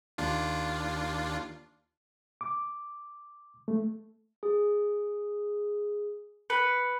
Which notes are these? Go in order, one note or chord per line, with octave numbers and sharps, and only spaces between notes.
D#2 D4 F4
D6
A3
G#4
B4 C#7